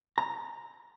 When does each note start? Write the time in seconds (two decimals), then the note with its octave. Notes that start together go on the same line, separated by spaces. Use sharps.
0.18 A#5